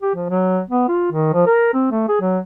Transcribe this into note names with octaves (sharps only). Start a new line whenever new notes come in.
G4
F3
F#3
B3
F4
D#3
F3
A#4
C4
A3
G#4
F#3